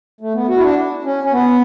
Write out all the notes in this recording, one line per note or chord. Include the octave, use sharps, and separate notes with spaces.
A3
B3
F#4
E4
D4
C#4
C#4
B3